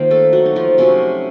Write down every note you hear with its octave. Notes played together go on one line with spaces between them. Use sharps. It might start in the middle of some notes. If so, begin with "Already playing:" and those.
Already playing: D#3 A#3 C4 D#4 F4 C5
A3 A4
F#3 F#4
D#4
F3 F4
C3 F#3 A3 C#4